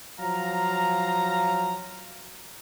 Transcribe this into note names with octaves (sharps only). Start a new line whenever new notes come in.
F3 F#3 F5 A#5